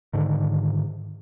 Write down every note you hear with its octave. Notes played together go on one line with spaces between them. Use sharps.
G#2 D3 D#3